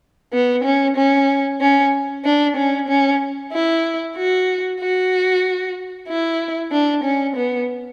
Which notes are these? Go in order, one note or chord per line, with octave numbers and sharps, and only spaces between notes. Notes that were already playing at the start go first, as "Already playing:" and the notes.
B3
C#4
C#4
C#4
D4
C#4
C#4
E4
F#4
F#4
E4
D4
C#4
B3